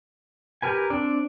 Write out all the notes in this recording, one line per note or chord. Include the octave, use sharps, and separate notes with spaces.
G4 A#4 B4 G#5
C4 D4 D5